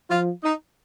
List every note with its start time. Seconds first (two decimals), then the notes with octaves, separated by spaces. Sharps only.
0.10 F3 F4
0.43 D#4